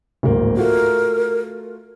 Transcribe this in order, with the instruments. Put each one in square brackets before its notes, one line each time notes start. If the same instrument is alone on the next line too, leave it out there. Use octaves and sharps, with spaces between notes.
[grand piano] D1 G#1 A#3
[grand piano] A3 F4 F#4 [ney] A#4